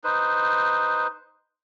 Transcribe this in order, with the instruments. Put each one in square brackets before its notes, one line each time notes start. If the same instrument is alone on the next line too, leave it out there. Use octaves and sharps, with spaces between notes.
[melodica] D#4 B4 C5